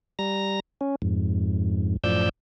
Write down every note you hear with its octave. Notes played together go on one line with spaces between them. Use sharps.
G3 A#5 A#6
C#4
F2 G#2
F#2 A2 F3 D5 E6 G6